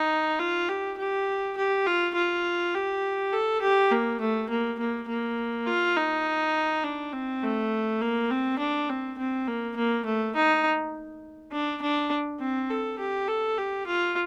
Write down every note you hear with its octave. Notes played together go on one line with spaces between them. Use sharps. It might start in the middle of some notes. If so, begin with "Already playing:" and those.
Already playing: D#4
F4
G4
G4
G4
F4
F4
G4
A4
G4
A#3
A3
A#3
A#3
A#3
F4
D#4
D4
C4
A3
A#3
C4
D4
C4
C4
A#3
A#3
A3
D#4
D4
D4
C4
A4
G4
A4
G4
F4